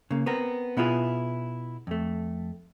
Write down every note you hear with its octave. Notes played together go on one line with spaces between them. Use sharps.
C#3 A#3
B3 C4 A#4
B2 B3 E4 F4 G#4
F2 A3